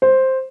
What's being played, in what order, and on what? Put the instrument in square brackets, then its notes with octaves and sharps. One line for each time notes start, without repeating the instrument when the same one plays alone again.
[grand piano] C5